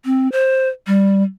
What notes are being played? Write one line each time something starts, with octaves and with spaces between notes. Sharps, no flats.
C4
C5
G3